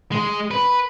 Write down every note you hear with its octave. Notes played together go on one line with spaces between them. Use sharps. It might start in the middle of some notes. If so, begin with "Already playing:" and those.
G#3
B4